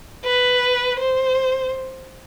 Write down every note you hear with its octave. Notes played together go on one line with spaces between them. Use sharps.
B4
C5